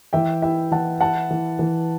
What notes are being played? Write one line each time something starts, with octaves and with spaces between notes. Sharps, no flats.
E3 E5 G5
E4 E5 G5
E3 F#5 A5
E4 F#5 A5
E3
E3